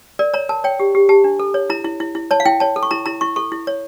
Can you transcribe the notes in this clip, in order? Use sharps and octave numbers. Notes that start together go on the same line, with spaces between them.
A#4 D5
C#5 A#5
A#4 A5
C#5 G5
G4
G4
G4 A5
D4
A4
C#5
E4 A#5
E4
E4
E4
C#5 A5
F5
E4 G5
C#5 A5
A4
C#6
E4 A#5
E4 A#5
E4 C#6
A4 C#6
E4
C#5